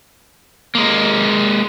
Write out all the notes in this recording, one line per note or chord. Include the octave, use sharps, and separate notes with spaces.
G#3 A#3